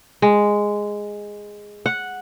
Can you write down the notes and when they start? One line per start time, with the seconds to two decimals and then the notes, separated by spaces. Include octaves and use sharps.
0.22 G#3
1.86 F#5